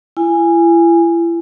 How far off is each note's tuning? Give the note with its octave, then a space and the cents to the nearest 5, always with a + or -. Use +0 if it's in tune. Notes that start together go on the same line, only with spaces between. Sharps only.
E4 +40 G#5 -10